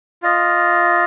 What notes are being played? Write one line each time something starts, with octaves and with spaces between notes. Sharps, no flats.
F4 D#5